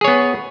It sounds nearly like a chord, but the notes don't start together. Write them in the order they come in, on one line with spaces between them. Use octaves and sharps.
G#4 C#5 B3